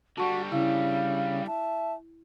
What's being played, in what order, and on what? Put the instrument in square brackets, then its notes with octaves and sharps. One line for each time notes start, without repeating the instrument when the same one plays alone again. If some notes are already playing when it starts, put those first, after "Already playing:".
[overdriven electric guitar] D3 G3 [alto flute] F#4 [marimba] A5 C#6
[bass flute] C#3 [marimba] E4 [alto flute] F5
[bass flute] E5 [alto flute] A5